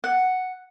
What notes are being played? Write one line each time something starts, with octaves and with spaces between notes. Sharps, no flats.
F#5